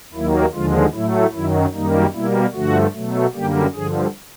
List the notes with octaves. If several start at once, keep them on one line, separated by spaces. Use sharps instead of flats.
D#2 D#3 F#3 A#3 E4
D#2 D3 F3 G#3 F4
A2 F#3 A3 E4
F#2 D#3 F#3 E4
F#2 D#3 G3 A#3 D#4
B2 G3 A#3 E4
G2 D3 F3 A3 F#4
B2 F#3 A3
F#2 D3 G3 A#3 G4
G2 D3 F3 G#4